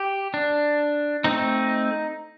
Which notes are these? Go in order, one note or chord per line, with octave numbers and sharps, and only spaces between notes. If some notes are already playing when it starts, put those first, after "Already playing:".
Already playing: G4
D4
A3 C4 D#4